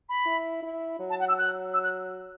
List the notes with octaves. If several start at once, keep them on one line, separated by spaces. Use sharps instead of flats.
B5
E4
E4
F#3
A5
F#5
E6
F#6
E6
F#6